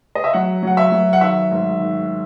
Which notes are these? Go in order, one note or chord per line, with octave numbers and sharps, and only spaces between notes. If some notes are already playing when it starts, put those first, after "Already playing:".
D#5
E5
F#3 F#5
F#3 F#5
E5
F#3
F#5
D#3 E5
G#2
D#3